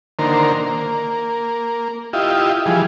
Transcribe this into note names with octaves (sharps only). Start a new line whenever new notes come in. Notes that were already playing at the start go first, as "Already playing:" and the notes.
D3 D#3 A#3 A#4 C5
A#3
E4 F4 G4 D#5
E3 F3 G3 G#4